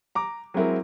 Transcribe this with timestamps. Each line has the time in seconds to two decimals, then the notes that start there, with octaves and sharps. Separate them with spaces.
0.15 A#5 D6
0.54 F#3 G#3 C4 E4 A#4